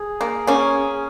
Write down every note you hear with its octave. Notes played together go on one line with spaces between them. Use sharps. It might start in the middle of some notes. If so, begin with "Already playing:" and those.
Already playing: G#4
A#3
A#3 C#4